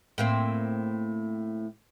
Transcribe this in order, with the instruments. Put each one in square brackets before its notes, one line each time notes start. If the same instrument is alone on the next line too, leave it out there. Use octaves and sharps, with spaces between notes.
[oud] A2 A#3 C4